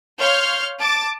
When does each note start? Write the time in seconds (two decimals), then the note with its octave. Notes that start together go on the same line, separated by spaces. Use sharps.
0.19 C#5 F5 C6 F6 G6
0.79 A5 D6 A6